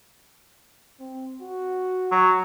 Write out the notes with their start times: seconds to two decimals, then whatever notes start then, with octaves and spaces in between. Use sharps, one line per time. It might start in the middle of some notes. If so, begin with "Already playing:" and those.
1.00 C4
1.42 F#4
2.12 F#3